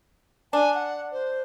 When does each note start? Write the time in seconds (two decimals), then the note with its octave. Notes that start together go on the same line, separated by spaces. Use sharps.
0.53 D4 G#5
0.75 F#5
1.12 C5